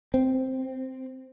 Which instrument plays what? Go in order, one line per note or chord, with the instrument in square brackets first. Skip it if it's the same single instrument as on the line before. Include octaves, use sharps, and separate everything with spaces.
[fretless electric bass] C4